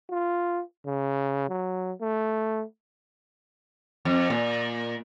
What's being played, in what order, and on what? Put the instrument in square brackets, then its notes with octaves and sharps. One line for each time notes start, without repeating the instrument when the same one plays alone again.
[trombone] F4
C#3
F#3
A3
[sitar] F2
A#2